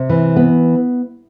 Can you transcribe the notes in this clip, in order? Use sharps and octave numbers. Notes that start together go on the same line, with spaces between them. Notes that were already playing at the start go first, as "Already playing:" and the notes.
Already playing: C3
E3
B3